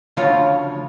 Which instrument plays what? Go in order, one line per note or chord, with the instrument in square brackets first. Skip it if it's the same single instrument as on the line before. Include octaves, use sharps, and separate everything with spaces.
[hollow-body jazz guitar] D2 C#3 F3 F4 C#5 F5